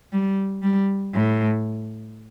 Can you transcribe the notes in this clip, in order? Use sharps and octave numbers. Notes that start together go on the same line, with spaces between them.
G3
G3
A2